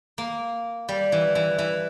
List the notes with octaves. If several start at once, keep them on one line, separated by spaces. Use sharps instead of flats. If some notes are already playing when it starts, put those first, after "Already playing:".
A#3
G3
E3
E3
E3